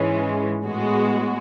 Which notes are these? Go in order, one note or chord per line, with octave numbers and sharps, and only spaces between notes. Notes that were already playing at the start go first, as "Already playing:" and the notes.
Already playing: G#2 E3 G#3 C#4
A2 G#3 B3 F#4